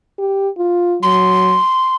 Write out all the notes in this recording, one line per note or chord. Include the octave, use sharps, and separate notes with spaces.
G4
F4
F#3 C6